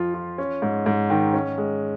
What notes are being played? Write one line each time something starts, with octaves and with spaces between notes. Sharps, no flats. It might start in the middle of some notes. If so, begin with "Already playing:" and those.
Already playing: F2 F3 F4
F4
C#4
G#2
G#2
D#3
C#4
G#3